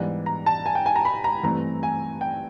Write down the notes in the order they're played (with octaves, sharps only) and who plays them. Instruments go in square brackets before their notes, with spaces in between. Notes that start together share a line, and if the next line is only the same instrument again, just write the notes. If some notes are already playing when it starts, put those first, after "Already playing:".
Already playing: [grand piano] G#2 E3 G3 B3 D4
A#5
A5
G#5
G5
G#5
A#5
B5
A#5
G2 E3 A3 C4 A#5
G#5
G5